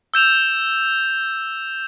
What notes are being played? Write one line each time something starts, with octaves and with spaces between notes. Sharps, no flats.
E6 G6 E7 F7